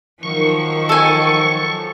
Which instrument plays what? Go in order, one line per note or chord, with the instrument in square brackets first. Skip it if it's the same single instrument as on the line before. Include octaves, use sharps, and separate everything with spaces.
[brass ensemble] D#3 [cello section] F3 F#3 [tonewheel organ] C#6
[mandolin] A4 G#5